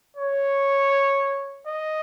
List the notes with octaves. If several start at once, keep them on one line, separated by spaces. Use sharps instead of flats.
C#5
D#5